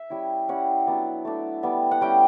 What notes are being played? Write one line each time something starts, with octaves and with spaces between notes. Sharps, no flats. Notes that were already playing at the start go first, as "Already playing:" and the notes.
Already playing: E5
G3 C#4 E4
G3 C#4 E4 F#5
F#3 B3 D4
A3 D4
G3 B3 D4
F#5
G3 C#4 E4 G5